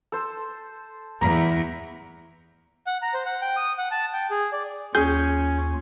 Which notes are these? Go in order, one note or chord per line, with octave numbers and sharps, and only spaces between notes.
A4 C5
E2 A#5
F#5
A#5
C5
F#5
G5
D#6
F#5
A5
G5
G#4
D5
D#2 C#4 F4 G#4 G6